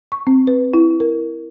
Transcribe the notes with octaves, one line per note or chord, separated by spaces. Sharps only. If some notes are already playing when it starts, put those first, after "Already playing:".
C#6
C4
B4
E4
A#4